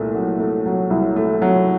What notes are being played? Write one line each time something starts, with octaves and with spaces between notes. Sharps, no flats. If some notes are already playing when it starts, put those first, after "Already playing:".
Already playing: C2 A#2 A3
F#3
A3
F#3
C2
A3
F#3